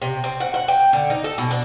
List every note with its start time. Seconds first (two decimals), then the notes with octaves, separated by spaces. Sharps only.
0.02 C3
0.24 C4
0.40 F#5
0.54 F#5
0.68 G5
0.93 D3
1.10 D#4
1.24 A4
1.38 B2
1.51 D4